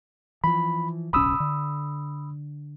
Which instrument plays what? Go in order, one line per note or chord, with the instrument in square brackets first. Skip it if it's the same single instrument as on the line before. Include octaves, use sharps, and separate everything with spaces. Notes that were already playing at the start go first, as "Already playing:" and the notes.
[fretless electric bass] E3 F3 [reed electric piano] B5
[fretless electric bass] D1 B1 C#4 [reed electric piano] B5 D#6 E6
[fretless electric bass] D3